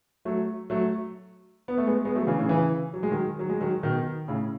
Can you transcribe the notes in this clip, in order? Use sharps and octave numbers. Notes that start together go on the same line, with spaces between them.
F#3 A3
F#3 A3
B3
A3
G#3 B3
G#3 B3
F#3 A3
C#3 E3
A2 C#3
C#3 E3
F#3
G#3
D#3 F#3
F#3
G#3
D#3 F#3
B2 D#3
A2 C#3